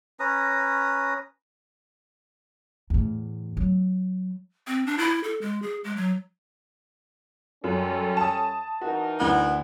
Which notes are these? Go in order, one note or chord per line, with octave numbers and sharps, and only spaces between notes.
C#4 B4 A#5 D#6
E2 A2
F#3
C4
D4
E4
A4
G#3
G#4
G#3
F#3
F#2 G3 C#4 A4
A5 D#6
E3 D#4 F#4 A#4
D2 B3 E4 F#5